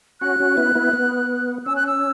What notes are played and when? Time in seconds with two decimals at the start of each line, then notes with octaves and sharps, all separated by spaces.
0.21 C#4 F#4 F#6
0.40 C#4 F#4
0.57 B3 E4
0.75 B3 E4
0.93 B3
1.66 C#4 E6
1.76 F#6
1.87 E6